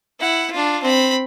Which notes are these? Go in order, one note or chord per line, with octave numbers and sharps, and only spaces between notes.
E4 F#5
D4 F4
C4 B5